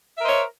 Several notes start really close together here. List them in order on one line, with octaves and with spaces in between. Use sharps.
E5 A#4 C5 D#5 C#5